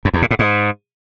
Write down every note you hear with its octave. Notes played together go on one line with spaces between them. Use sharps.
F#2
E2
A#2
A2
G#2